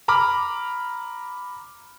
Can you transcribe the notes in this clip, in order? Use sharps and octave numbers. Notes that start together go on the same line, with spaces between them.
A#5 B5 D6 F6